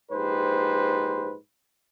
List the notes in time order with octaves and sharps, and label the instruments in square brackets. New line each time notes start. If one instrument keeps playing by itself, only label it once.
[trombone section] A#1 G#2 G4 B4 C5